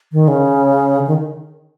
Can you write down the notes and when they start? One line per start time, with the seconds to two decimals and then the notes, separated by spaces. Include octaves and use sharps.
0.12 D#3
0.28 C#3
1.07 D#3